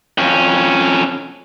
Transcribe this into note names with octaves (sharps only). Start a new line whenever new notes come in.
F2 C#4